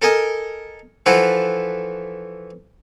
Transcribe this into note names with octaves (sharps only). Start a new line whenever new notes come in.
A4 A#4 D#5 G#5
E3 F3 E4 F#4 A4